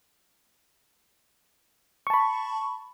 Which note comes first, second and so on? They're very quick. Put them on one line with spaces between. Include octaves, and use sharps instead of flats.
C#6 A5 B5